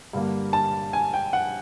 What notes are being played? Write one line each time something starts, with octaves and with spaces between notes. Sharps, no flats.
G2 D3 G3 A#3
A5
G#5
G5
F#5